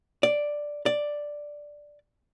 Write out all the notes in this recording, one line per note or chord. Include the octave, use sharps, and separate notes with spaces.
D5
D5